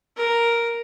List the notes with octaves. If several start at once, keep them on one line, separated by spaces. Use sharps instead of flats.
A#4